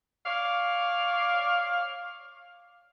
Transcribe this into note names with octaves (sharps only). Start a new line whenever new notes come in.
C#5 D5 F5